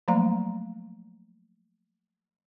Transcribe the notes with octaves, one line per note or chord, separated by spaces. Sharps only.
F3 F#3 A3 A#3 F5 A#5